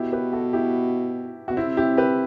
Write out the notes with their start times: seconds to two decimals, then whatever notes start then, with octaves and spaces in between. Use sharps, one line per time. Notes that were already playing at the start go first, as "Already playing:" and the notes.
Already playing: B2 E4 G4
0.12 G4 B4
0.33 F#4 A4
0.53 E4 G4
1.48 B2 F#4
1.57 C3 C4 E4
1.77 E4 G4
1.97 G4 B4